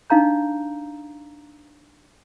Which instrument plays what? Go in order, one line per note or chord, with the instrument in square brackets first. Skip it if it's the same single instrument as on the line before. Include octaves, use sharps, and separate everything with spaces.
[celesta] D4 D#4 F5 A#5 G6